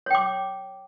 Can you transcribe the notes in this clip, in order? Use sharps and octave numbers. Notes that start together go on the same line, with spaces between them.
C#5 G5 D6